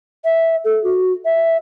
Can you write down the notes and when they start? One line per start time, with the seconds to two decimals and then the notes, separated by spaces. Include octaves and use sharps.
0.24 E5
0.64 A4
0.84 F#4
1.25 E5